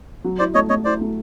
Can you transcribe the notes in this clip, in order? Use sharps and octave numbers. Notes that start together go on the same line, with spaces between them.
F#3
E4 C5 D5
A3 C#5 D#5
A3 C#5 D#5
E4 C5 D5
A3